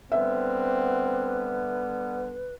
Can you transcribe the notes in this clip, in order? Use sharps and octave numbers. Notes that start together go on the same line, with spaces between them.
D3 G3 B3 C4 B4 E5